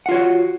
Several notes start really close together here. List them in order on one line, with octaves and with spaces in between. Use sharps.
F#5 F4 C#5 F#4